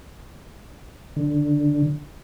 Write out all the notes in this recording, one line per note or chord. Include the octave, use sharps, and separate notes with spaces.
D3